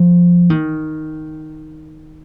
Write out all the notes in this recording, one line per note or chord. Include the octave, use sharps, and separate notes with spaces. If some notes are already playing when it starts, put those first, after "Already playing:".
Already playing: F3
D#3